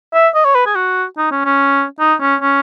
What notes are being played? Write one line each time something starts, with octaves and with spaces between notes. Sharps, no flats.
E5
D#5
C#5
B4
G#4
F#4
D#4
C#4
C#4
D#4
C#4
C#4